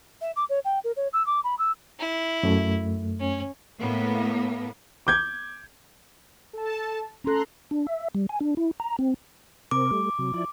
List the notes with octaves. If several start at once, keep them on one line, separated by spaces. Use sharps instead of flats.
E5
D6
C#5
G5
A#4
C#5
E6
D6
B5
E6
E4
F#2 A3
C#4
A2 A#3 B3
D6 G6 G#6
A4 A5
C#4 A4 A#5 C6 F#6
D4
E5
G3
G#5
D4
E4
A#5
C4
C3 C4 A#4 D6
G3 A3
C3 F#3
F3 E4 D5